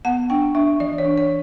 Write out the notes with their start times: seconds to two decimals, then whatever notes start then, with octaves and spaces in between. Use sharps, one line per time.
0.05 B3 F#5
0.30 D4 G5
0.55 D4 E5
0.80 E3 D5
0.98 C#5
1.05 D4
1.18 C#5